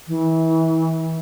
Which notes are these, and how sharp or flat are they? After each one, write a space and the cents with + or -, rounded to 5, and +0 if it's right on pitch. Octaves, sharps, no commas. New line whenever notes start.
E3 -30